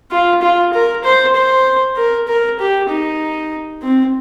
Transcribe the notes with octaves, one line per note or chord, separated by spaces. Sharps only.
F4
F4
A#4
C5
C5
A#4
A#4
G4
D#4
C4